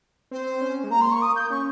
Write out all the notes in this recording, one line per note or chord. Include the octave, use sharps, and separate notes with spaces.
C4 C5
C#4
G#3
A#3 A#5
C6
C#6
D#6
G6
C#4 C#6